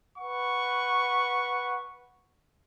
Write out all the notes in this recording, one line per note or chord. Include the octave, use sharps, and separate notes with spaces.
B4 F#5 C#6